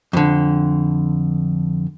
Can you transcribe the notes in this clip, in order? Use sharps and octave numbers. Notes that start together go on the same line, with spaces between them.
F2 D3